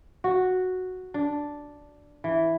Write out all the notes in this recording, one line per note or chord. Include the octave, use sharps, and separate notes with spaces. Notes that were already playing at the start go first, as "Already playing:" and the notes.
F#4
D4
E3